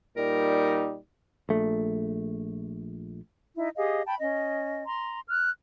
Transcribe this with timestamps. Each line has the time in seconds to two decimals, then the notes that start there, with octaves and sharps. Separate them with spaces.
0.17 A#2 G3 D#4 A#4
1.49 A#1 A3
3.55 D#4 E4
3.77 G4 G#4 D#5 F5
4.06 G5 A5 B5
4.20 C#4 D#5
4.86 A#5 C6
5.29 F6 F#6